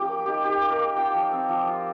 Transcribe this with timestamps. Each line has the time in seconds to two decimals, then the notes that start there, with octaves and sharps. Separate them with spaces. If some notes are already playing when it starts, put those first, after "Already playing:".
Already playing: F3 C#4 F4 G4
0.08 A#3
0.26 D#4 G4
0.44 D#4 G4
0.61 A#3
0.70 A#4
0.79 A#3
0.96 F4 G5
1.14 F3
1.32 C4
1.49 F3
1.67 F4